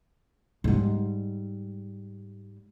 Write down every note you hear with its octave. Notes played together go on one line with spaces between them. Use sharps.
G#2 G3